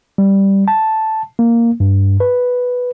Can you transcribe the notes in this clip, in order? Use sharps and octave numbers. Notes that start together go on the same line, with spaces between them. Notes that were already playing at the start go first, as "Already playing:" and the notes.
G3
A5
A#3
G2
B4